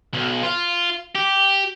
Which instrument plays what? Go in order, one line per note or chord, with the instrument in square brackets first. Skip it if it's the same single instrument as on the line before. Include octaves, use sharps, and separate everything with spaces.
[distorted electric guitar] B1
F4
G4